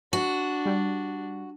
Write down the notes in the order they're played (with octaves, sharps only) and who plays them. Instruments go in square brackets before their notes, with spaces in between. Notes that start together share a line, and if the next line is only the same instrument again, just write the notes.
[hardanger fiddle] D4 [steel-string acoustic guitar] F#4
[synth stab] G3